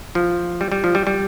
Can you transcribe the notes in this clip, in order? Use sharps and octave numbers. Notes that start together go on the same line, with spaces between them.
F3
G3
G3
F3
G3
G3